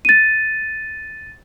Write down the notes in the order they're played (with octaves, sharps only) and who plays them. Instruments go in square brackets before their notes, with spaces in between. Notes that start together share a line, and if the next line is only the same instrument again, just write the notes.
[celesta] A6 D#7